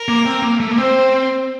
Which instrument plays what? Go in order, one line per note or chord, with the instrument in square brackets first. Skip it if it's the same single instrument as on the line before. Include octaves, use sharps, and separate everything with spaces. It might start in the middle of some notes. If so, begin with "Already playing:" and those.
Already playing: [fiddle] A#4
[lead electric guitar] A#3
C4
A#3
A3
A#3
[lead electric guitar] C4 [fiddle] C5